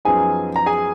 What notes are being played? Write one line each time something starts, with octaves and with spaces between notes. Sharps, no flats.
F#2 F3 B3 D#4 G#4 G#5
A#5
G#4 G#5